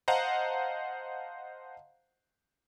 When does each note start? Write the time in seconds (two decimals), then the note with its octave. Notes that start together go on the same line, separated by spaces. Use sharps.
0.08 C5 D#5 F5 F#5 A5 A#5